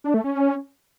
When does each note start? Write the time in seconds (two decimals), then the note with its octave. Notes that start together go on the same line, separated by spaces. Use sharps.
0.04 D4
0.14 A3
0.24 C#4